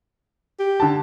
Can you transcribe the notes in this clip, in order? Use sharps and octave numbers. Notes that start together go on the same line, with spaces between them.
G4
D3 A5